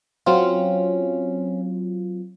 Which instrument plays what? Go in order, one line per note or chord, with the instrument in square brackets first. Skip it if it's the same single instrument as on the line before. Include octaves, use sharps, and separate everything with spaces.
[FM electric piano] F#3 C4 F4 [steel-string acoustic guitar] C#4